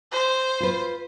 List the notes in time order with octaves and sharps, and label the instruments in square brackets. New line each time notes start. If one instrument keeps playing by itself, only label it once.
[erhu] C5
[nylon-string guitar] F4 B4